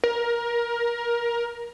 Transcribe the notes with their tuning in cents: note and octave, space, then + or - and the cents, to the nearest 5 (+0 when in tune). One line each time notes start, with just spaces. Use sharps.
A#4 +20